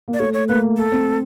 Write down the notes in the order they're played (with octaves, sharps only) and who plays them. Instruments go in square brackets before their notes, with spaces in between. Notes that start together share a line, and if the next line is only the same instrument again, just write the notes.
[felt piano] A#3
[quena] D5
[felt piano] A3 [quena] C#5
[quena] C#5
[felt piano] A#3 [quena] B4
[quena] A4
[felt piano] C4